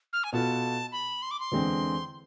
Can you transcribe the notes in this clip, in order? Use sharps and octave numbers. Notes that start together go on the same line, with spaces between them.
F6
G#5
B2 B3 F4 A4 A5
B5
C6
D6
C6
E2 D3 G#3 C4